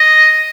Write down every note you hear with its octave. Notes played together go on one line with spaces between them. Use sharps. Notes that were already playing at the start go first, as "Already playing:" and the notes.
Already playing: D#5